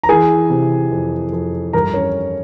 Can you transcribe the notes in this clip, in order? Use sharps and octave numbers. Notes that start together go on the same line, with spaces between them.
A#5
E3 G#4 G#5
C3
F2
F2
G2 A#4 A#5
C#4 C#5